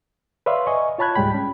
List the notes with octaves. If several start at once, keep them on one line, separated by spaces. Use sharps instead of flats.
B4 C#5 D5 E5 F5 C6
D#5 G#5 C#6
F4 C#5 A5 B5 F#6 G#6
C#2 G#2 G3 G#3 G5 B5
C#4